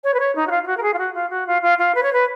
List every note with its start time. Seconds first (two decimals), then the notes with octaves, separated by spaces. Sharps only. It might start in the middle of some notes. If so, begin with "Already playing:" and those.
0.04 C#5
0.14 B4
0.19 C#5
0.35 D#4
0.47 F#4
0.51 F4
0.63 F4
0.66 F#4
0.77 A#4
0.82 G#4
0.94 F4
0.98 F#4
1.14 F4
1.30 F#4
1.47 F4
1.62 F4
1.78 F4
1.95 B4
2.03 C#5
2.13 B4